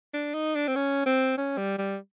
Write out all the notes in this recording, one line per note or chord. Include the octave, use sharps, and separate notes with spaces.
D4
D#4
D4
C4
C#4
C4
C#4
G3
G3